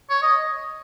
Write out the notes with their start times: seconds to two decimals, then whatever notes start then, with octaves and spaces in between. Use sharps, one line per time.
0.10 C#5
0.22 D#5